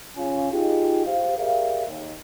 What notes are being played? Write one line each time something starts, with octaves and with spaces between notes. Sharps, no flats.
C#3 C#4 F4 G#5
D#4 F4 G4 G#4
G4 C5 F5
G4 G#4 A#4 D5 E5 F5
D#2